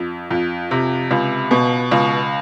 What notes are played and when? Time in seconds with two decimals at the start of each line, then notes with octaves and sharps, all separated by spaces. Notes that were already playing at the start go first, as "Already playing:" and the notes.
Already playing: F2
0.30 F2
0.71 C3
1.11 C#2
1.51 B2
1.91 C#2